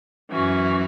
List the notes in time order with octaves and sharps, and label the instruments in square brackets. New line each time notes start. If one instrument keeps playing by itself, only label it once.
[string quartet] F#2 E3 C#4 F#4